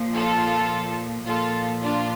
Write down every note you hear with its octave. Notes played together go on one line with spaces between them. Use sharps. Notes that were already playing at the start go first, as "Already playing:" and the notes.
Already playing: A#2 F3
F4 A4
A#2 F3 F4 A4
D4 F4